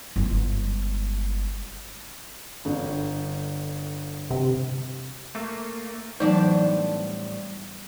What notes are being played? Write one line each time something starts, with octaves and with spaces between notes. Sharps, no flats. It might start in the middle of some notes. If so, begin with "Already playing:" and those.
G1 G#3
G1 D3
C3
A3 A#3
A2 E3 F#3 G3 B3 D4 D#4 C5